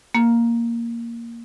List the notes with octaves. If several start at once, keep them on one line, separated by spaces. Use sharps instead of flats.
A#3